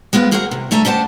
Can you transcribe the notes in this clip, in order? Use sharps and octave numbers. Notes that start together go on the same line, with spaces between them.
G#3 B3 C4 F4
F#4 G#4 A#4 C5 C#5 F#5
C3
D2 A3 E5 G#5 A#5
C#4 G4 C5 F#5 A5